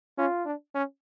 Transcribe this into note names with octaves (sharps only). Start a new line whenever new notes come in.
C#4 F4
D4
C#4